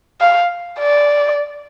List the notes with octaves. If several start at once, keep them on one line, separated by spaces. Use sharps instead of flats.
F5
D5